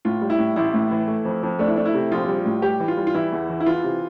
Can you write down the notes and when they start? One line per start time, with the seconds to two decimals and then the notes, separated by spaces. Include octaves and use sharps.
0.05 A2 F4
0.22 G3
0.30 E4
0.38 A2
0.56 A1 E4
0.74 A2
0.91 E3
1.08 A3
1.25 F2
1.43 F2
1.59 A3 D4
1.67 E4
1.76 A3 D4
1.86 E4
1.94 C3
2.12 A#1 F4
2.28 G3
2.46 A2
2.62 G3 G4
2.80 E3
2.88 F4
2.97 G3
3.07 F4
3.14 E3 E4
3.32 E2
3.49 E3
3.60 E4
3.66 E3 F4
3.84 C3